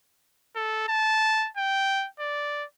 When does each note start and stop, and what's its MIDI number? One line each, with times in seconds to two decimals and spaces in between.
0.56 0.88 69
0.88 1.48 81
1.57 2.07 79
2.20 2.64 74